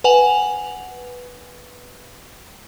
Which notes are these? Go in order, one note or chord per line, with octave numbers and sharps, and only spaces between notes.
B4 F#5 G#5 F7 F#7